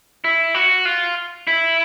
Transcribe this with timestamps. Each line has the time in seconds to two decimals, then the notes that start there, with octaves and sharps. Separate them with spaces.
0.24 E4
0.55 F#4
0.85 F4
1.47 E4